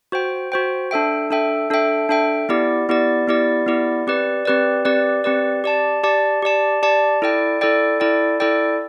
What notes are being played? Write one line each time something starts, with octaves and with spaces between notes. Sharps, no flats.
F#4 C5 G5
F#4 C5 G5
D4 A4 E5 G5
D4 A4 E5 G5
D4 A4 E5 G5
D4 A4 E5 G5
B3 E4 G4 D5
B3 E4 G4 D5
B3 E4 G4 D5
B3 E4 G4 D5
C4 G4 B4 D5
C4 G4 B4 D5
C4 G4 B4 D5
C4 G4 B4 D5
G4 D5 A5
G4 D5 A5
G4 D5 A5
G4 D5 A5
E4 A4 D5 G5
E4 A4 D5 G5
E4 A4 D5 G5
E4 A4 D5 G5